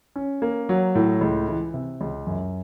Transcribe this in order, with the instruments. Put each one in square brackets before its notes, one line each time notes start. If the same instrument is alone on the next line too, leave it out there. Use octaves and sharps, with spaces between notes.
[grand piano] C#4
A#3
F#3
A2
C#2
E3
C3
C#2
F#2